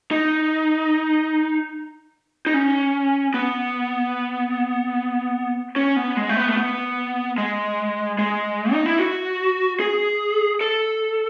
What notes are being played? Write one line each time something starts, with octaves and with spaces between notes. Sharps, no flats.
D#4
D#4
C#4
B3
C#4
B3
G#3
A3
B3
A3
B3
G#3
G#3
D#4
E4
F#4
G#4
A4